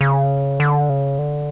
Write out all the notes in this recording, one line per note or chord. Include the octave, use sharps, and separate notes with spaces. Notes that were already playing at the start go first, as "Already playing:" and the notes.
C#3
D3
C#3
D3